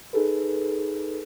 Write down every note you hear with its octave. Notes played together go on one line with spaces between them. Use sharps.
D#4 G#4 A4 B4